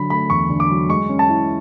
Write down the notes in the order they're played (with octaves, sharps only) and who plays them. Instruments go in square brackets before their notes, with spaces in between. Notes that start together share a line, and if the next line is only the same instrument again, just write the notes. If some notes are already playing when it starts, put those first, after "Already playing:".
Already playing: [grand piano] D3 F#3 B5
A3 B5
E2 C#6
D3
D6
F#3
G#3 C#6
C#4
A5
E4